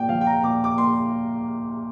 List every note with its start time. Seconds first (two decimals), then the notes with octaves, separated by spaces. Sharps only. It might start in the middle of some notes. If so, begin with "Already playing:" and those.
Already playing: A#2 G5
0.09 F3 F5
0.21 G5
0.27 A#5
0.43 A#2 D6
0.64 D6
0.78 A#3 C6